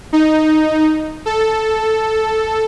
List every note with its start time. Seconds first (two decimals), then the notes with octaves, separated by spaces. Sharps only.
0.13 D#4
1.26 A4